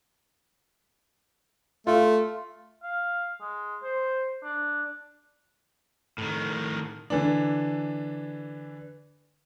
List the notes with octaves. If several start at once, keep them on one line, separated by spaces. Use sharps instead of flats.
A3 F4
F5
G#3
C5
D4
A2 D#3
D3 E3 D4